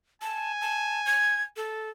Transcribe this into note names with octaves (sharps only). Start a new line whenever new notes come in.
G#5 A5
A5
G#6
A4